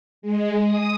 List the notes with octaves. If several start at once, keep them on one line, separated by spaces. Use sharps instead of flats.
G#3
D#6